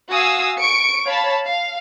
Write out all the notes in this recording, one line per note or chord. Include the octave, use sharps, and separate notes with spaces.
F#4 F5 G#5 D#6 E6
C#6 C#7 D7
C#5 F5 A5 B5
F5